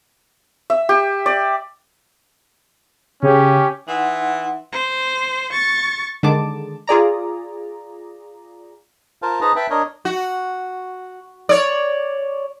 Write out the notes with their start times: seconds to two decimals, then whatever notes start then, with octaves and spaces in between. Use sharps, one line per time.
0.70 E5
0.89 G4
1.26 D5
3.23 C#3 C#4 G4
3.88 E3 D#4 F#5 C6
4.73 C5
5.53 C#6 A6
6.23 D3 D#3 G#3 A5 D6
6.87 F4 G#4 D5 A#5
9.22 F4 A#4 C5 F5 A5
9.41 D#4 G#4 B4 C5 A5 A#5
9.56 B4 E5 G5 A5 B5
9.70 D4 A#4 C#5 D#5
10.05 F#4
11.49 C#5 D5